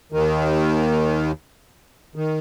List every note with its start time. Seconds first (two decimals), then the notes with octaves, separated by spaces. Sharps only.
0.12 D#2 D#3
2.16 D#3